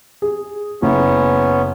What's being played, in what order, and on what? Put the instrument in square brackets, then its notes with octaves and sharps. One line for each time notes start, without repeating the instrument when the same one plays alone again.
[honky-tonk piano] G#4
[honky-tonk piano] F#1 [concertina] B3 C#4